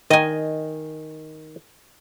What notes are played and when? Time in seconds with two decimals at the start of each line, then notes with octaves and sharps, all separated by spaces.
0.10 D#3 D#5 G#5